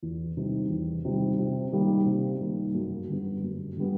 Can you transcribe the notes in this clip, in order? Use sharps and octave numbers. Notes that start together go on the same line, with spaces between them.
E2
C3 D#3 G3
E2
C3 D#3 G3
C3
D#3 G3 A#3
C3
D#3 G3 A#3
F#2
D3 G3 B3
F#2
D3 G3 B3